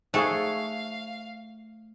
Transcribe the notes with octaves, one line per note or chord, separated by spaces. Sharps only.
A3 D#4 G#4 C5 F5 G5 C#6